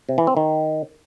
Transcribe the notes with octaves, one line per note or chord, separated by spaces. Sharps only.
C3
E3
C4
D#3